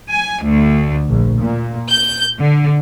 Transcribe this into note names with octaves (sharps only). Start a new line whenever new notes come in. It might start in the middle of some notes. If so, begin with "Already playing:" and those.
G#5
D2
A#1
A#2
G6
D3